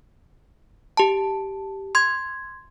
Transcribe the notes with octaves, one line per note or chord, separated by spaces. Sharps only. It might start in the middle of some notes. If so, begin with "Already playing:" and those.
G4 A5
C6 G#6